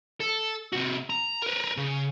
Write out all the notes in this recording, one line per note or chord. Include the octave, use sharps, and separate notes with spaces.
A4
C3 F#4
A#5
A#4 B4
C#3